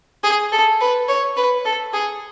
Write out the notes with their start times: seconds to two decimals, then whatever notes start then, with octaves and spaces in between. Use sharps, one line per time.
0.23 G#4
0.52 A4
0.81 B4
1.08 C#5
1.37 B4
1.65 A4
1.93 G#4